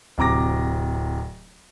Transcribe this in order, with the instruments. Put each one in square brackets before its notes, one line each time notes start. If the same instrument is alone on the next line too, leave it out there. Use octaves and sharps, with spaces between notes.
[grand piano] D1 C3 A#5 D6 A#6